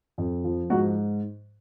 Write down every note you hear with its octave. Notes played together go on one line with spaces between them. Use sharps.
F2
F3
G#2 F#4